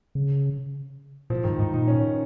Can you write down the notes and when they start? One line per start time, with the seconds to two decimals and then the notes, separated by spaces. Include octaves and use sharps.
0.15 C#3
1.30 A#2 F3
1.44 G#2 D#3
1.59 G#2 D#4
1.73 A#2 D#4
1.88 C#4